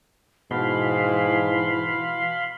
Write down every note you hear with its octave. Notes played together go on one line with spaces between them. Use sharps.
G#2 B2 E3 F5 B5 C6